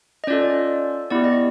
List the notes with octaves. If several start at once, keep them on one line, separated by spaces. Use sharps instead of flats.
D#5
C#4 F4 A4 D5
B3 E4 G4 D5
D#5